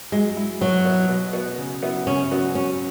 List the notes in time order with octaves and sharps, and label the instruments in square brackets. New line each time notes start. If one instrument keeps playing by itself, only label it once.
[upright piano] F#3 [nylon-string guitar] G#3
[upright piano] E4
[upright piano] B2 [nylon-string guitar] F#3
[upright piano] B3 E4
B2
B3 F#4
C#3
F#3 B3 E4
[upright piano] C#3 [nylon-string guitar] C#4
[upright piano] F#3 B3 F#4
[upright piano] F#3 [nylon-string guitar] C#4